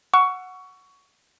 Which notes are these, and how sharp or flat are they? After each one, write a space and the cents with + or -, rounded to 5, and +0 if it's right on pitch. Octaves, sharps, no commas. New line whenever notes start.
F#5 -5 C#6 +15 E6 +30